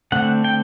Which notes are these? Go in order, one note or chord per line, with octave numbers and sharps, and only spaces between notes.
D3 A3 C4 F#5
G5